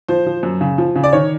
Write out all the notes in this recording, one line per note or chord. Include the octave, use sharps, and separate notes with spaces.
F3 C5
F3
F#2
C#3
F3
C#3
D5
D#3 C#5